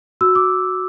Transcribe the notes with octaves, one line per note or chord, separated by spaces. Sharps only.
F#4 E6
D6